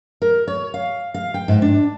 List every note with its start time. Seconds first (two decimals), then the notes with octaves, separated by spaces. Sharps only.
0.22 A#4
0.48 C#5
0.74 F5
1.14 F5
1.34 G5
1.48 G#2
1.62 D4